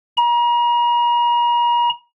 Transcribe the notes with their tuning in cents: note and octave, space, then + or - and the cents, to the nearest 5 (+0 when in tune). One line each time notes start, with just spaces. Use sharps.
A#5 +40